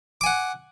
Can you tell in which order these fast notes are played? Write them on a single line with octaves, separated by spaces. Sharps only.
D6 G#5 F#5